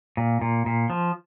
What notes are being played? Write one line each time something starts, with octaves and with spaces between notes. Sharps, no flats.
A#2
A#2
A#2
F3